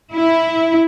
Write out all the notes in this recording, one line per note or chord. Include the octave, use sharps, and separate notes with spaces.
E4